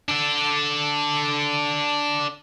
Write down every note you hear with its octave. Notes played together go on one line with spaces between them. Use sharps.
D4 A4